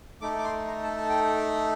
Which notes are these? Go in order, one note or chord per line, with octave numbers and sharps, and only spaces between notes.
A3 D#4 A4 D6
D6
C6
A#5
A5
A5
G5